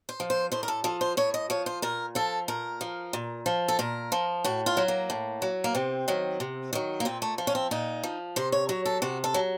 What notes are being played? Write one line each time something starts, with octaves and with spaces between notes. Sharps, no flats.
C5
F3
C5
A2 C5
A#4
A4
F3 A4
C5
A2 C#5
D#5
F3 C#5
C5
A#2 A#4
F3 A4
A#2 A#4
F3
A#2
F3
A4
A#2 A#4
F3
A2 F#4
F4
F#3
A#3
A2
F#3
A#3
C3 C4
D#3 F#3
C3
D#3 F#3
A#3
A#2 C4
A3
F3
C#4
C4
A#2 D#4
F3
C3 C5
C#5
F#3 C#5
A4
C3 F#4
A4
F#3